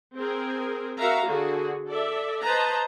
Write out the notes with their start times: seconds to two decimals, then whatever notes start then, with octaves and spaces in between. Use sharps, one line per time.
0.17 C4 G#4 A#4
0.97 F#4 A#4 E5 F5 A#5
1.27 D3 F#4 G#4
1.87 A4 D5 E5
2.43 B4 C5 D#5 A5 A#5